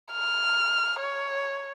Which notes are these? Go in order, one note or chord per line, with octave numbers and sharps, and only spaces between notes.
F6
C#5